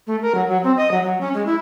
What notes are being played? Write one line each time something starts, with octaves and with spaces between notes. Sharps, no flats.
A3
A#4
F#3
F#3
C4
D#5
F#3
F#3
C#4
G#3
E4